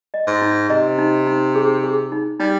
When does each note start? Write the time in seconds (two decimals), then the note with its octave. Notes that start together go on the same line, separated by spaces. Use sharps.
0.14 D#5
0.27 G#2
0.42 D#4
0.69 C3 D#5
0.98 D#4
1.27 D#4
1.55 G#4
1.83 G#4
2.12 D#4
2.40 G3 D#4